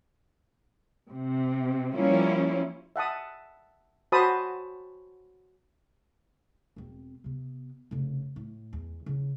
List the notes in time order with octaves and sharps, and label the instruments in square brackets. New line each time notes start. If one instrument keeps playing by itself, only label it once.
[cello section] C3
F3 G3 A#3 C#4 E4 F4
[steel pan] E5 F#5 A5 D#6
F#4 C5 A5 B5 D#6
[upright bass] E1 C4
C3 B3
F1 C#3
A2
E2
C#3 E3